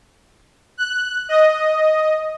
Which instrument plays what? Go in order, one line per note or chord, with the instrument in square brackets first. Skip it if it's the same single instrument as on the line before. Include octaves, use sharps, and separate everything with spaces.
[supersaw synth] F#6
D#5